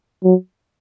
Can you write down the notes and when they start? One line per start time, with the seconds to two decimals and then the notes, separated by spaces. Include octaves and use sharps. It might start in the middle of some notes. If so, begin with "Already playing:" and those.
0.24 F#3